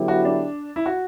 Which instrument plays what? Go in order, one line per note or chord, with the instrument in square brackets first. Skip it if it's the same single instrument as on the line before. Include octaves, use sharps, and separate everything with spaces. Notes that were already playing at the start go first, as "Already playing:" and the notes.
Already playing: [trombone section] D3 F#3 B3 E4 G4
[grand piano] F#4
D4
E4
F#4